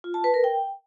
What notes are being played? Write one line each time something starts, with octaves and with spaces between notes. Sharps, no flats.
F4
A5
B4
A#4
G5